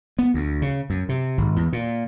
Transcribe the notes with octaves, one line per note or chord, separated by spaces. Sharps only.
B3
D2
C#3
F#2
C3
G#1
E2
A#2